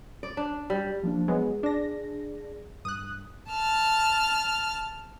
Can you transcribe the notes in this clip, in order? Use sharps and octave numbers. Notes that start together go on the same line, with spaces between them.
D5
D4
G3
F3 A#3 D4
F#3 G#3 B3 G#4
D4 A#6
G2 D#6 F#6
A5 F6